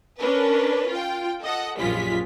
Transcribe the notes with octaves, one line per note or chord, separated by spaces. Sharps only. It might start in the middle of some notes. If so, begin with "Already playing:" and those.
C#4 D4 A#4 B4
F4 G5
A4 D#5 F#5
A#1 F#2 G3 G#3 F4 B6